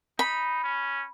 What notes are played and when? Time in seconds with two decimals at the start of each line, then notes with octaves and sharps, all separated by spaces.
0.19 D#4 B5
0.64 C#4